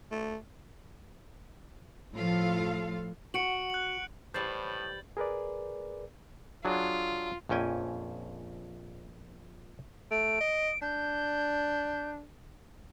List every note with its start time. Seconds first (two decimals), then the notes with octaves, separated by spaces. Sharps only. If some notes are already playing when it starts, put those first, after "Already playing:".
0.11 A3
2.14 A2 F3 F4 A4 F5
3.34 F#4 C#7 D7 F#7
3.70 F#6 F#7
4.34 A2 E3 G3 C5 C#5 G6 A6 F#7
5.17 G#4 A#4 B4 D5
6.65 F#3 D4 F4 G#4
7.49 A#1 F2 C#4 G5 G#5
10.11 A3 D7
10.41 D#5
10.82 D4 G6